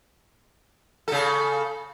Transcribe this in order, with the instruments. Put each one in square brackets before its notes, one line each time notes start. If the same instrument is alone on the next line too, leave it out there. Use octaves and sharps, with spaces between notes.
[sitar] C#3 A4